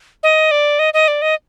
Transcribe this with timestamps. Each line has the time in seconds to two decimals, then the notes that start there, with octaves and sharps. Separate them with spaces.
0.23 D#5
0.51 D5
0.79 D#5
0.94 D#5
1.08 D5
1.22 D#5